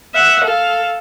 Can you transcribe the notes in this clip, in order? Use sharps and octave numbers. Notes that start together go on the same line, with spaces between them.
E5 F#5
A4 F5